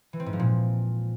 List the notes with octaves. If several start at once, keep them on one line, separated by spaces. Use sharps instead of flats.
E3
C4
G#2
F3
A#2